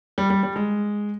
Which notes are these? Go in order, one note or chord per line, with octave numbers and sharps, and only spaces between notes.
G3
G3
G3
G#3